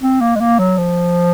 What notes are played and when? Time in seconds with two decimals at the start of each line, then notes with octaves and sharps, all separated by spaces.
0.02 C4
0.21 A#3
0.36 G#3
0.40 A#3
0.59 F#3
0.78 F3